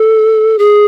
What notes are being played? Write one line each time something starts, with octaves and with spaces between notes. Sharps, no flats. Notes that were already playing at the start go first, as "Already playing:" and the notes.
Already playing: A4
G#4